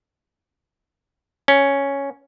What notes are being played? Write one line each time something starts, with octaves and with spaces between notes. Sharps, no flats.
C#4